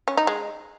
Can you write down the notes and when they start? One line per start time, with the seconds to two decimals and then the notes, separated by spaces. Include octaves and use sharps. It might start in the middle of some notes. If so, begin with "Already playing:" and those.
0.08 C#4
0.17 D#4
0.27 G#3